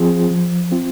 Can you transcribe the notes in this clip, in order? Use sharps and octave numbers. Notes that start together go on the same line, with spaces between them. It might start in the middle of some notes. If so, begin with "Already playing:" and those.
Already playing: F3 C4 F4 G#4
F3
C4 F4